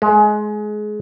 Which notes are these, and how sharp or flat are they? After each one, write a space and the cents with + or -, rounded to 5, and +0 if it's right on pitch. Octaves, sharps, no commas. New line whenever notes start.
G#3 +25